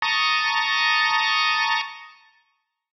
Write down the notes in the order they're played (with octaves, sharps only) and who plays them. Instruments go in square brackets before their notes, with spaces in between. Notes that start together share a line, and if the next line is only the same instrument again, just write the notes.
[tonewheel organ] A5 A#5 C#6 D#6